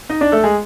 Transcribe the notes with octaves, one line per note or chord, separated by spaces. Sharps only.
D#4 D#5
D4 D5
A3 A4
G#3 G#4